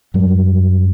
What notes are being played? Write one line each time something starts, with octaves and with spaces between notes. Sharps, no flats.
F#2 F#3 G3